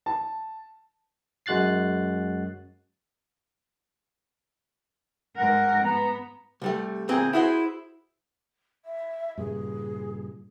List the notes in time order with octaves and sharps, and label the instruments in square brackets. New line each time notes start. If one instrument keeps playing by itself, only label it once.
[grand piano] A5
[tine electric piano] F#2 G#3 F#4 F#6 A6 C7
[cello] G#2 A#4 [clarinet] F#5
[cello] B3 [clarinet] A#5
[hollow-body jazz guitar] C2 G3 A3
D2 A#2 C4 G#4 A#5
E4 F#4 G#4 C5
[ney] E5
[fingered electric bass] G2 A#2 C#3 [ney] G#4